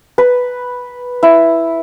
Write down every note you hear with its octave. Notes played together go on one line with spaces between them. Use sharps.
B4
E4